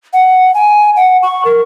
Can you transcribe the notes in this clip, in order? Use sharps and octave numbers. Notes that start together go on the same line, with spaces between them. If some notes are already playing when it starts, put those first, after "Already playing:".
F#5
G#5
F#5
C#6
A#4